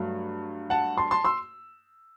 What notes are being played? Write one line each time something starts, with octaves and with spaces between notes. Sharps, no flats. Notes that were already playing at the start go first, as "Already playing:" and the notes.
Already playing: G2 F#3 A3
F#5 A5
A5 C6
A5 C6
C6 E6